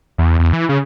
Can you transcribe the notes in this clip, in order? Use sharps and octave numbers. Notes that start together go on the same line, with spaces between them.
E2
E2
E3
C#3